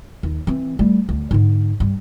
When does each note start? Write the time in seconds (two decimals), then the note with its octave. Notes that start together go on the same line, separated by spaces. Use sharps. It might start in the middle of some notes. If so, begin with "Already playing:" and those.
0.23 D#2
0.47 E3 C4
0.79 G3 A3
1.09 D2
1.31 G#2 D3
1.80 G2